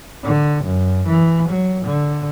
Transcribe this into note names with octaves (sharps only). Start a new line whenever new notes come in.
D3
F#2
E3
F#3
D3